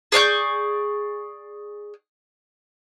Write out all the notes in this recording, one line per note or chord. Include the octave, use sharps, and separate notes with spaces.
G#4 D5 C#6 G6